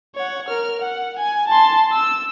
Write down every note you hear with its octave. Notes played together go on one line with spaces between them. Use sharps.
C#5 F#5
A#4 F6
F#5
G#5
A5 C6
E6